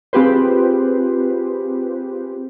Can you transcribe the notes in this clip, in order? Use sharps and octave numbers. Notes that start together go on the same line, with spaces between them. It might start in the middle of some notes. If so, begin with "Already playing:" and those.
C4 F4 G4 G#4 B4 C5